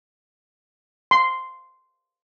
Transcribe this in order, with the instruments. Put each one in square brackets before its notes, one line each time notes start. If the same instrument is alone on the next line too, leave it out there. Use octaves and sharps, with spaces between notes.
[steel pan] C6